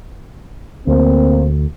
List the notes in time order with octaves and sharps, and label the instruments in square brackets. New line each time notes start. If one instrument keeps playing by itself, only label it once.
[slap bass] D2 [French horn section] A#3 C4